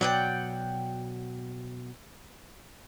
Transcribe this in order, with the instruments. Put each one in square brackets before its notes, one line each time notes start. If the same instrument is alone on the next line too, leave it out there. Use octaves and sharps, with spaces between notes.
[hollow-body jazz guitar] B2 F#3 [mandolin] D5 F#5 G5